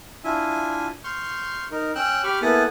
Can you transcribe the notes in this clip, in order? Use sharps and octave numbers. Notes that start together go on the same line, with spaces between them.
D4 E4 F4 E5 G#5
C6 C#6 F6 G6
D#4 A#4
C#4 G5 E6 F#6
G4 B5 C#6 D6 F6
A#3 B3 E4 A4 F#5 G#5